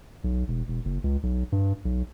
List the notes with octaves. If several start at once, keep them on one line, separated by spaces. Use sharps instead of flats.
B1
E1
E1
F#1
C#2
B1
G2
B1